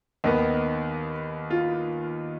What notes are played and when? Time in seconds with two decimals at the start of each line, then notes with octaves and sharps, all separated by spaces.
0.24 D#2 D#3 B3 D#4
1.50 F4